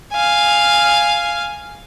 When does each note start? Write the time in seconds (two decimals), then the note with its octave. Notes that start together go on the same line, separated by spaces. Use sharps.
0.12 F5 G#5